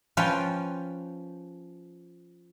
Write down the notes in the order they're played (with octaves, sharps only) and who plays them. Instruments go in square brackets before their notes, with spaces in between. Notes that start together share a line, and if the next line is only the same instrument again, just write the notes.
[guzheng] F3 C#4 F4 B4 G5